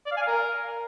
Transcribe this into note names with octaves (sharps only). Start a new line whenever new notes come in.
D5
F5
G#5
F5
A#4